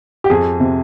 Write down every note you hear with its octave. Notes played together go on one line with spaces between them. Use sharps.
G4
F2 G#4
C3